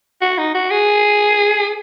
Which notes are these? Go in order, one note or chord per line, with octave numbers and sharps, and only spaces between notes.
F#4
D#4
F#4
G#4